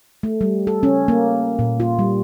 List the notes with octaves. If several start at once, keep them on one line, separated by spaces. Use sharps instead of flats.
A3
G3
A4
C#4
A#3
A#2
F4
G3